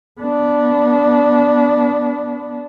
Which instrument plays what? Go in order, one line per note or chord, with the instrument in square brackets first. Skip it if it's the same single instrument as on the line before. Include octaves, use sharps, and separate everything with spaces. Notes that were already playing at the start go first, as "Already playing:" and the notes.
[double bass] B3 D4